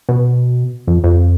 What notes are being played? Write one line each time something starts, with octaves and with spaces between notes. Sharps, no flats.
B2
F2
F2